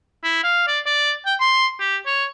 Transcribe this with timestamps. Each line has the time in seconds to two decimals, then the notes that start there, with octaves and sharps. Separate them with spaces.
0.24 E4
0.44 F5
0.68 D5
0.86 D5
1.26 G5
1.40 C6
1.80 G4
2.06 C#5